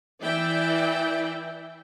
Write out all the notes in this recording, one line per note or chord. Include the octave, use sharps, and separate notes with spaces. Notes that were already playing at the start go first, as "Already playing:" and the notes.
E3 E4 D5 E5 G5